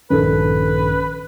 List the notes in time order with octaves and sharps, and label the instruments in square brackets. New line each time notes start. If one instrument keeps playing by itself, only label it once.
[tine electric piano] A#1 G2 D#3 [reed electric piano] C#4 A4 [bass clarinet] B4